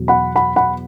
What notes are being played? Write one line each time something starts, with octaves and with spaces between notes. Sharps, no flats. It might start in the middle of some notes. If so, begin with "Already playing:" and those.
Already playing: E2 B2 F#3
F#5 B5
F#5 B5
F#5 B5